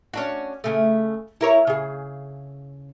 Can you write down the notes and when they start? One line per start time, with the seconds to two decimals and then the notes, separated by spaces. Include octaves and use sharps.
0.13 C#4 D4 F#4
0.64 C#3 A3
1.41 E4 A#4 C#5
1.67 C#3 G#4